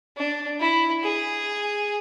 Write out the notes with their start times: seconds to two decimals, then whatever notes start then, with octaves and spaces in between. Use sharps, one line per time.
0.17 D4
0.60 E4
1.04 G#4